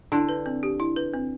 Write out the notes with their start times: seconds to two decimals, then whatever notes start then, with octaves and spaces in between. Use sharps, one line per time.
0.12 D3 E4
0.29 B4
0.46 C4
0.63 G4
0.80 E4
0.96 B4
1.14 C4